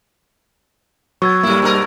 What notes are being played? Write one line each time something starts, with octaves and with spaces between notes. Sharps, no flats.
F#3 B3 C#6 E6 G#6
G#2 G3 A#3 E4
G2 B2 A#4